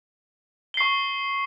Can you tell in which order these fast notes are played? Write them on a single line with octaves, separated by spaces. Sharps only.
G7 C7 C#6